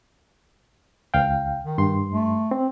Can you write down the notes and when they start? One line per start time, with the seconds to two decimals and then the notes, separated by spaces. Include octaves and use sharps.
1.14 C#2 F5 G5
1.64 D#3
1.78 G2 C6
2.12 A3
2.51 C4